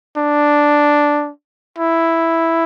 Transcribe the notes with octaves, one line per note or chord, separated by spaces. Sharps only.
D4
E4